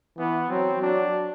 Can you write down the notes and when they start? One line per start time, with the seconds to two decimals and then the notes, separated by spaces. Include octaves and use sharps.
0.18 E3 B3
0.50 F#3 C4
0.82 F#3 D4